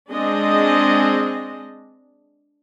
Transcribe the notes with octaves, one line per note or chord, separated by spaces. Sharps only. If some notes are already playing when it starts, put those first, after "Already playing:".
G#3 C4 D4 D#5